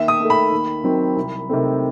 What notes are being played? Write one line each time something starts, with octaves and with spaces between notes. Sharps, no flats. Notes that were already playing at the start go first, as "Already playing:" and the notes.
Already playing: D#2 E5
D#6
D#3 A3
B5
D#2
D#3 F#3 C4
C2
C3 D#3 A3 C4